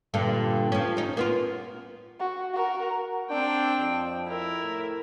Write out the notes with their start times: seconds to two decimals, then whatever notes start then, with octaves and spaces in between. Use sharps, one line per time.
0.14 G2 A#2 D3
0.72 F3 C#4
0.97 C#4 D#4
1.17 A#3 B3 F4
2.20 F#4
2.53 F#4 A#4
3.31 C4 D4 G5
3.80 F2
4.28 E4 A#4
4.63 A2